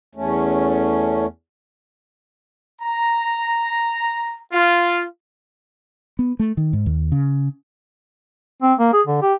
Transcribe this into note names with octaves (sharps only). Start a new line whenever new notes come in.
E2 A3 C#4
A#5
F4
B3
A3
D#3
G#2
D#2
C#3
C4
A#3
G#4
D3
G4